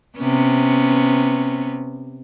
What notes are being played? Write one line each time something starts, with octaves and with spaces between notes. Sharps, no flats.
C3 B3 C#4